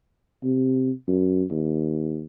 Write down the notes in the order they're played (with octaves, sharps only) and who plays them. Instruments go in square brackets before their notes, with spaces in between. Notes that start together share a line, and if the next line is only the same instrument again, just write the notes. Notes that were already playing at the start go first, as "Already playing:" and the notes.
[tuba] C3
F#2
D#2